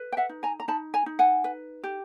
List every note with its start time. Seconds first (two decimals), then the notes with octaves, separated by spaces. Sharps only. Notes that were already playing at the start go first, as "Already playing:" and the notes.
Already playing: B4
0.12 G5
0.17 E5 F#5
0.29 D#4
0.43 G#5 A#5
0.60 A#5
0.68 D#4 A5 B5
0.94 G#5 A#5
1.06 D#4
1.19 F#5 G#5
1.44 B4
1.84 G4